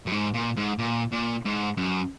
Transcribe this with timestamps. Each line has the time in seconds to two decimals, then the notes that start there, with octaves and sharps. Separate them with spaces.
0.07 F#2
0.12 G#2
0.34 A#2
0.57 G#2
0.79 A#2
1.12 A#2
1.45 G#2
1.77 F#2